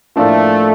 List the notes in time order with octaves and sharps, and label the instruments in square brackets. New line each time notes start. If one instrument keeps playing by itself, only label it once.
[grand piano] A2 F3 A#3 D4 F4 [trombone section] A3